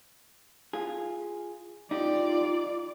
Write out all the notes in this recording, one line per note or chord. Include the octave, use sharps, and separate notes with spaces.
F4 G#4
D#4 F4 G4 D5